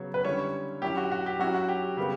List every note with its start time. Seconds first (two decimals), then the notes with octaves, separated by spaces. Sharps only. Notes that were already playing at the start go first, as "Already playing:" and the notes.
Already playing: C#3 F#3 B3 C#5
0.14 B4
0.24 D3 G3 C#4 E4 C#5
0.82 F#3 C#4 E4 G4
0.97 F#4
1.12 F#4
1.26 G4
1.39 F#3 C#4 E4 F#4
1.54 F#4
1.69 G4
1.97 C#3 G3 B3 G4